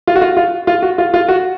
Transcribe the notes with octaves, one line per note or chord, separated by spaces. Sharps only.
F4
F#4
F4
F4
F4
F#4
F4
F4
F#4